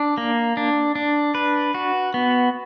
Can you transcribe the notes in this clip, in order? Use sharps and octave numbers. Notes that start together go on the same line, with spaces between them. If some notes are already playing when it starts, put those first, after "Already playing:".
Already playing: D4
A#3
D4
D4
B4
F#4
B3